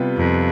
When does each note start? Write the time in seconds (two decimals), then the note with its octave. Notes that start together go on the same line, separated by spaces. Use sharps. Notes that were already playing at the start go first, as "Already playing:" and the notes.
Already playing: C3 G3 B3 F4 B4
0.16 F2